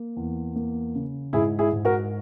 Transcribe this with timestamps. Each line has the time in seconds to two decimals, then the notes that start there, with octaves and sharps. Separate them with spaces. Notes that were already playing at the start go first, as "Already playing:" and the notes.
Already playing: A#3
0.16 E2
0.56 A#3
0.95 C#3
1.33 G#2 E4 G#4
1.59 E4 G#4
1.73 G#2
1.85 F#4 A#4